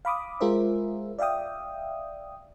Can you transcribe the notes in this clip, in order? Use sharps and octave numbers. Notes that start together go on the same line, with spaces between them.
F5 B5 D6 D#6
G#3 F4 G#4 A#4 C5 E5
D5 E5 F5 G5 D#6